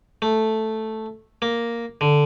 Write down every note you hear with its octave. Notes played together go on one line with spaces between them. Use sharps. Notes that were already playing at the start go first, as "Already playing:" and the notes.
A3
A#3
D3